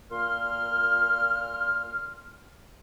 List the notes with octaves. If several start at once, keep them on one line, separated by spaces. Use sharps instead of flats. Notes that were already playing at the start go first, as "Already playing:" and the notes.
A#2 C6 F6